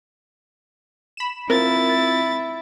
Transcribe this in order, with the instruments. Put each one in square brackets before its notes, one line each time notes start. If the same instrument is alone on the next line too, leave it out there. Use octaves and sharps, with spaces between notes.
[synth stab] B5 E7
[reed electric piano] C4 F4 [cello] E4 [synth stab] A#4 [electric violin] A6